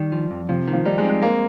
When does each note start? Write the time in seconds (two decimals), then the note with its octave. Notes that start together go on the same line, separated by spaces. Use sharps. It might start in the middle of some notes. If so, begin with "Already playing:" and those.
Already playing: D#3 G3
0.12 F3
0.31 F2
0.49 C3 F3
0.68 D#3
0.73 F3
0.85 G3 D#4
0.98 G#3
1.04 C4
1.09 G#3
1.22 G#3 A#3